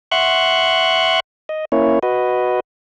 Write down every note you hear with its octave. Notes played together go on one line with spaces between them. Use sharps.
E5 F#5 C6 C#6 F#6
D#5
A#3 C#4 E4 C#5
F#4 B4 D#5